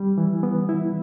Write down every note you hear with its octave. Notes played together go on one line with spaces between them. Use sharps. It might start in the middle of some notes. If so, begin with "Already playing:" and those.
Already playing: G3
E3
B3
E4